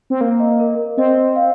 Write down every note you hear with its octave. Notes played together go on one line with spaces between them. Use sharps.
C4
A#3
D#5
A#4
C4 D#5
F5